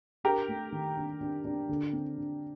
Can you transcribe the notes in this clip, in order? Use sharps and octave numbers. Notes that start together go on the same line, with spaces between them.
D4 G4 A#4
A3
D#3
D4
D4
D4
D3
C4
D3